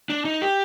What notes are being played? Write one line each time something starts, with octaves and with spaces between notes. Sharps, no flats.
D4
D#4
G4